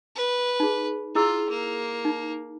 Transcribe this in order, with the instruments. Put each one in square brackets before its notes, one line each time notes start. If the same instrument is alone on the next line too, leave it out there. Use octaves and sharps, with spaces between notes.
[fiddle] B4
[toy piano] D#4 G#4
[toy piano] E4 G#4 E6 [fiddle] F4
[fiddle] A#3
[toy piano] D#4